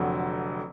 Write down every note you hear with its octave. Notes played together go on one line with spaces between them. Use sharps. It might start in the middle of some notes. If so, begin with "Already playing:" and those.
Already playing: F1 F2 D3 F#3